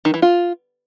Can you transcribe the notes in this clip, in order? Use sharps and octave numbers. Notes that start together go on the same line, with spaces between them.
D#3
E3
F4